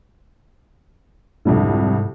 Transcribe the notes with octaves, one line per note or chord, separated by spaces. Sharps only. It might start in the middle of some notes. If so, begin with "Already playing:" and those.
C2 F2 G#2 D3